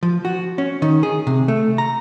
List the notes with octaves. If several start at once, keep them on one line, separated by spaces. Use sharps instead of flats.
F3
F#4
C#4
D#3
G#4
C3
A3
A#5